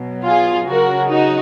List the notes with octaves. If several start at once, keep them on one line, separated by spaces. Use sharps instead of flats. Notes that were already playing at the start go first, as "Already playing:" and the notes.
Already playing: B2 F#3
F4 G#4
C#3 F#3 F#4 A#4
D#4 F#4